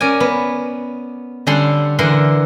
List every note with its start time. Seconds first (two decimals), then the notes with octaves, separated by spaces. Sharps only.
0.01 C#4 A#4 D5 G#5
0.20 B3
1.47 D3 G3 C#4 A4 F#5 C6
1.99 D3 E3 A#4 F#5 C6